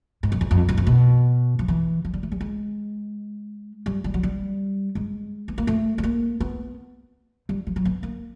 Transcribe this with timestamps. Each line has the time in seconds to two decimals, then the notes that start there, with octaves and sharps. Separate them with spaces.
0.23 G#2
0.32 F#2
0.41 E2
0.51 F2
0.69 F#2
0.78 F2
0.87 B2
1.59 F3
1.68 E3
2.05 F3
2.14 G3
2.23 A3
2.32 G3
2.41 G#3
3.86 G3
4.04 G3
4.14 F#3
4.23 G3
4.95 G#3
5.48 B3
5.58 A#3
5.67 A3
5.98 A3
6.03 A#3
6.41 B3
7.49 G3
7.67 F3
7.76 F#3
7.85 B3
8.03 A#3